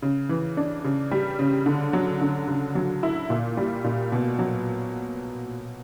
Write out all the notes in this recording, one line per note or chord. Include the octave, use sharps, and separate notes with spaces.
C#3
E3
D4
C#3
G3
C#3
D3
F#3
D3
C#3
F#3
E4
A#2
G3
A#2
B2
F#3